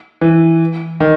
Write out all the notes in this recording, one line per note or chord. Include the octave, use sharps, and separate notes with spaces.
E3
D#3